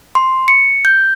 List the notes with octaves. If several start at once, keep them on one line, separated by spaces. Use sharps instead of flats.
C6
C#7
G6